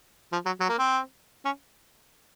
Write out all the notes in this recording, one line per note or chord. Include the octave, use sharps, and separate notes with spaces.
F3
F#3
F#3
A#3
C4
C#4